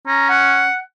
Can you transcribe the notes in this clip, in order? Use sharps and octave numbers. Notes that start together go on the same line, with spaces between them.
C#4 A#5
F#5